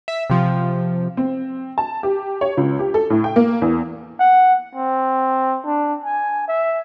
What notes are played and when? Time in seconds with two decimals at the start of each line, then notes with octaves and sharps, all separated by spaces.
0.08 E5
0.30 C3 F3
1.17 C4
1.78 A5
2.03 G4
2.41 C#5
2.57 C#2
2.79 G4
2.94 A4
3.10 A2
3.24 G5
3.36 A#3
3.62 E2
4.20 F#5
4.75 C4
5.65 D4
6.04 G#5
6.48 E5